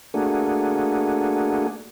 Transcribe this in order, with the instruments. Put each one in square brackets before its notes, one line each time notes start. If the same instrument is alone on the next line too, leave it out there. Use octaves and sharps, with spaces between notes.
[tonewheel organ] A3 A#3 D4 F#4 G#4